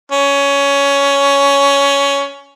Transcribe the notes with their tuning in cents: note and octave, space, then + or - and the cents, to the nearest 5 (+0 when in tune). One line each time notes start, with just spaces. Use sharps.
C#4 +15